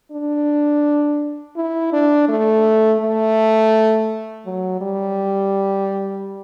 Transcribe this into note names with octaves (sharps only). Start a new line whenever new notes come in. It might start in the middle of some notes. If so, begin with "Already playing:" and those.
D4
E4
D4
A3
A3
F#3
G3